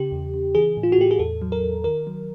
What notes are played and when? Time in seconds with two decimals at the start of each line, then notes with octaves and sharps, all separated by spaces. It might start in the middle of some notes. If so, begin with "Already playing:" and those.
Already playing: C#3 G4
0.12 E2
0.34 C#3
0.55 E3 G#4
0.77 A2
0.83 F4
0.92 F#4
0.98 A2 G4
1.11 G#4
1.19 E2 A4
1.42 F#3
1.52 A#4
1.64 E2
1.84 D#3 A#4
2.07 F#3